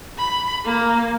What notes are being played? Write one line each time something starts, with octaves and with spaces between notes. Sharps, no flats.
B5
A#3